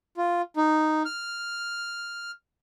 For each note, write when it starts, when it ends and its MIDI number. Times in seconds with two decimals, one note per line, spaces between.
0.17 0.42 65
0.57 1.03 63
1.05 2.31 89